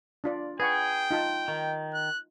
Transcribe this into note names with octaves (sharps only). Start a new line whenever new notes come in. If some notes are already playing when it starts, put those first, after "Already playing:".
D4 F4 D5
G#4 B4 F#5 G5 C#6
D#4 F4 A5
D#3
F#6